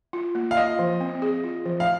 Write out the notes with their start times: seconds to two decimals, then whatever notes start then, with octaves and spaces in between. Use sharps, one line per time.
0.13 F4
0.35 A#3
0.51 F5
0.57 F4 D#5
0.79 F3
1.00 C4
1.22 G#4
1.44 F4
1.66 F3
1.80 F5